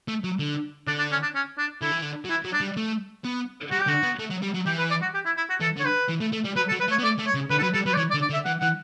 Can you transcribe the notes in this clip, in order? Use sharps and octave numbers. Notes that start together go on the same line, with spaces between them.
A3
F#3
D3
D3 D4
D4
C#4
D4
C#4
D4
D3 E4
E3
D3
F#3
E3 E4
F#3
D4
G3
A3
B3
G3 F#4
G4
D3 F#4
B3
A3
F#3
G3
F#3
E3 G4
B4
D5
F#4
G4
E4
E4
F#4
E3 A4
D3
C#5
B4
E3
A3
A3
G3
F#3 B4
A4
F#3
B4
A3
C#5
B3
A3 D5
A3
C#5
C#3
D3 B4
A4
F#3 B4
G3 A4
F#3 B4
D5
E3 C#5
D5
D3
D5
D3
E5
E3 F#5
E3 F#5